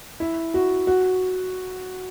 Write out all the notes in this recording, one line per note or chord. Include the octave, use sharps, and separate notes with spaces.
E4
F#4
F#4